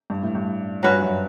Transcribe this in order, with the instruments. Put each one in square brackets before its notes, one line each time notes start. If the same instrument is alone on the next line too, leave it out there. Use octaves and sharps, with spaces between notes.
[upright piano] G2
A2
G2
[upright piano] G2 [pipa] F#3 C#4 F#4 B4
[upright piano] F#2